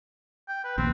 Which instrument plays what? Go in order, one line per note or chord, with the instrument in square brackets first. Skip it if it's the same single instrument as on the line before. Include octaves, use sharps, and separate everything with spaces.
[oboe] G5
B4
[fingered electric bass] A#1 D#2 [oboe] C4